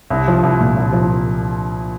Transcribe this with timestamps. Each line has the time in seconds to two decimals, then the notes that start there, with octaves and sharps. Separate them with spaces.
0.10 C2
0.28 F3
0.43 C2
0.60 A#2
0.77 C2
0.93 F3